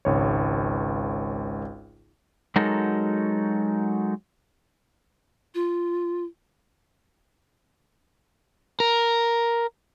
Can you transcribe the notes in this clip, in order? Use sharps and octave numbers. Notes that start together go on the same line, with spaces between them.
G#1 C#2 C#5
F#3 G#3 D#4 F#4 A4 A#4
F4
A#4